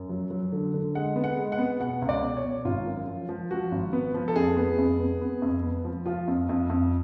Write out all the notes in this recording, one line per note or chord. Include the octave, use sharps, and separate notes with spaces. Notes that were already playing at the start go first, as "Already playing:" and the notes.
Already playing: F#2
F#3
F#3
D3
D3
G#3 F#5
B3
F#5
G#3
F#5
B3
B2 F#5
C#2
D5
B2
C#5
B2
G#1 F4
F#2
F3
F3
F3 F#4
G#1
B3
F3
A4
F2 G#4
B3
F2
B3
B3
F2
B3
F3
F3 F4
F2
F2
F2